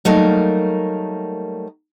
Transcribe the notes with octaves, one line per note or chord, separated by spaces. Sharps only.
F#3 G3 A3 A#3 D#4 A#4